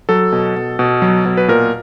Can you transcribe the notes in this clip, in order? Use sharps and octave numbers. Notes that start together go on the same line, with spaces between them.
F#3 A4
B2
B2
B2
F#3
B2
B4
A#2 A#4